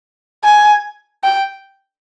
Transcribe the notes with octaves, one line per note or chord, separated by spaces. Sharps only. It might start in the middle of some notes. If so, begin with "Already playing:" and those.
G#5
G5